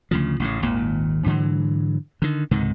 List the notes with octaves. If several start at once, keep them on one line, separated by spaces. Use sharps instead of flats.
D2 C#3 F3
A1 A2 C#3
G#1 D#2 A#2
G#2 D3 E3 F#3
D3 D#3
C#2 G#2 C3 D#3